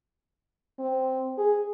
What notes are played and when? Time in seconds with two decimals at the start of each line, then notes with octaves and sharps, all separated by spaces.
0.79 C4
1.38 G#4